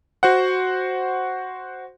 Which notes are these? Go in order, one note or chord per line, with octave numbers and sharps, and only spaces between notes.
F#4 C5 F#5